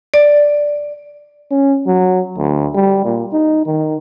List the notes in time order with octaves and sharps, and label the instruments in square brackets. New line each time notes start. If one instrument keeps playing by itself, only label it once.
[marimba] D5
[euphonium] C#4
F#3
D2
G3
A#2
D#4
D#3